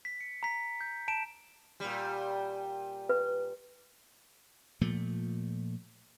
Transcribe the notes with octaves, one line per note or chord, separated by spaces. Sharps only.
B6
C#7
A#5 B6
G6
A5 D7 E7
A#2 G3
B4
A#2 F3 A3